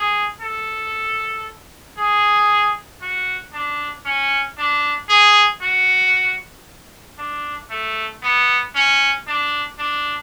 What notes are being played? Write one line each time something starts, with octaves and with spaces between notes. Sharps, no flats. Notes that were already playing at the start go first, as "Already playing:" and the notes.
Already playing: G#4
A4
G#4
F#4
D4
C#4
D4
G#4
F#4
D4
A3
B3
C#4
D4
D4